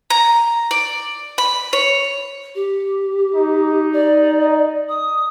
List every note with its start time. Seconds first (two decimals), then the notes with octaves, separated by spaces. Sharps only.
0.10 A#5
0.71 D5
1.38 B5
1.73 C#5
2.55 G4
3.35 D#4
3.93 D5
4.89 D#6